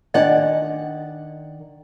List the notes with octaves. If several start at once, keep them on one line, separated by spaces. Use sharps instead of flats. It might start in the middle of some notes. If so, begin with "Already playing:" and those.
D#3 D4 D5 D#5 F#5